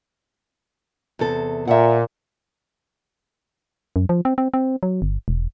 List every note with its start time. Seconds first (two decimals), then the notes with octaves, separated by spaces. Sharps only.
1.19 E2 C3 A4
1.68 A#2 E5 F#5
3.96 F#2
4.09 F3
4.25 C4
4.38 C4
4.54 C4
4.83 F#3
5.02 G1
5.28 E1